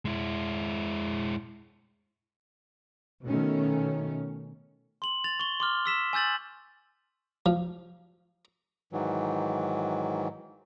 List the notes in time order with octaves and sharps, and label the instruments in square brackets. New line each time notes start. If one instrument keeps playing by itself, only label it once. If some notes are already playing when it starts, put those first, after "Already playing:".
[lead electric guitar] G#3 E4
[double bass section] B2 D#3 A3 C#4
[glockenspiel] C6 F#7
A6 F7
C#6 G7
C6 D6 F6
E6 B6 E7
G#5 E6 G6 A6 F#7
[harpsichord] F3
[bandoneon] G#2 D#3 E3 F#3